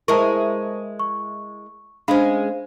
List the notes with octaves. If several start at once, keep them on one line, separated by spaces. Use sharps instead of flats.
G#3 E4 A#4 C5 A5 C#6
C#6
G#3 C#4 D4 C5 F5